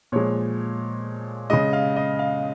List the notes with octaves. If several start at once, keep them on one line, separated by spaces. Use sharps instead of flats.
A#2 F3 G#3 C#5
C#3 G#3 D#5
F5
D#5
F5